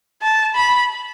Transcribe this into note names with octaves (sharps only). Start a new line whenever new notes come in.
A5
B5